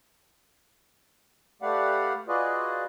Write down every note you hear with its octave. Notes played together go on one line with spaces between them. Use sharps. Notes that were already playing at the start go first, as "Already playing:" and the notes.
A3 G4 B4 D5 F5 F#5
F4 F#4 G#4 B4 D5 D#5